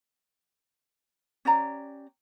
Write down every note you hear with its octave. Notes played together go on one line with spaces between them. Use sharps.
C#4 G4 D5 A#5